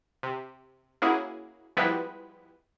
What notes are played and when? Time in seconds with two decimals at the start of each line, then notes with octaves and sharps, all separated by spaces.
0.23 C3
1.02 A#3 C#4 E4 F#4 G#4
1.77 F3 G3 G#3 B3 E4 B4